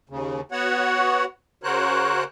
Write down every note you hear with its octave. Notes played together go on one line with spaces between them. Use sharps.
D#2 C#3
B3 F#4 C#5 F#5
C#3 F#4 A#4 C5 C#5 F#6